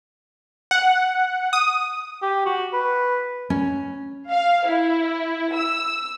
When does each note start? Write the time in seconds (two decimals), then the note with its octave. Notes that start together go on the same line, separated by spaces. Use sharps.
0.71 F#5
1.53 D#6
2.22 G4
2.46 F#4
2.73 B4
3.50 C#4
4.29 F5
4.68 E4
5.54 E6